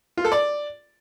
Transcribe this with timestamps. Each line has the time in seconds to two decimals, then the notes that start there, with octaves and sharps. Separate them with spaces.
0.17 F4
0.25 A4
0.32 D5